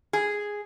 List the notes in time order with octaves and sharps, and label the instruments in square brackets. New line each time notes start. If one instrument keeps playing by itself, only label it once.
[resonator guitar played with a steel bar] G#4